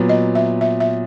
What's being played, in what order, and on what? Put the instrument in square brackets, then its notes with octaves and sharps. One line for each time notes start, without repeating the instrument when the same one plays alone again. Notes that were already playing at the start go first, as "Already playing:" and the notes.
Already playing: [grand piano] A#2 F#3 B3
[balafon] D#5
E5
E5
E5